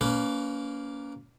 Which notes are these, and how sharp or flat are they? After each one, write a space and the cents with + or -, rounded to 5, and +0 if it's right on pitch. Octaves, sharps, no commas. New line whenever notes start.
A#3 +0 C#4 +35 B4 +20